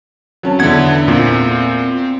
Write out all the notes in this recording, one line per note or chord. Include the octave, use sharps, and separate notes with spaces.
F#3 C#4 A5
E2 D3 E4 B4 F#5 G#6
A#2 C4